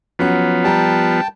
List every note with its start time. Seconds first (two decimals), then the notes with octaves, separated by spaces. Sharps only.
0.19 F3 F#3 B3 C#4 F#5
0.64 G3 G5 A5 A#5